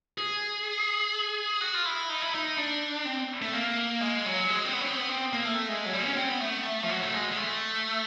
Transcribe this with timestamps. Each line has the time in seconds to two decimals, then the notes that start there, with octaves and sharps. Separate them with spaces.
0.18 G#4
1.61 F#4
1.74 F4
1.85 E4
2.09 D#4
2.22 E4
2.35 D#4
2.57 D4
3.05 C4
3.42 A3
3.53 A#3
4.01 G#3
4.26 F#3
4.50 G#3
4.65 C4
4.73 B3
4.81 C#4
4.85 C4
4.97 B3
5.09 C4
5.33 A#3
5.45 A3
5.69 G#3
5.85 F#3
5.93 G3
6.05 C#4
6.16 C4
6.29 B3
6.40 A3
6.83 F3
6.89 F#3
7.02 A3
7.13 G#3
7.31 G#3
7.37 A3